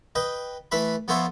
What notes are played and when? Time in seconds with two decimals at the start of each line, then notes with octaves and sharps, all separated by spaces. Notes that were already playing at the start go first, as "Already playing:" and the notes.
0.15 B4 D#5 G5
0.72 E3 A3 B4 E5 B5
1.08 F3 B3 A4 C5 C#5 E5